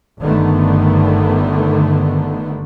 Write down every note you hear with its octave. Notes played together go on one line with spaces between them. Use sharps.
G1 D3 D#3 A3 B3